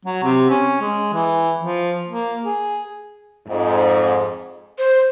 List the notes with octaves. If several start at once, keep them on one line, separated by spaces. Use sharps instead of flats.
F#3
C3
C#4
G#3
E3
F3
A#3
G#4
F2 G#2
C5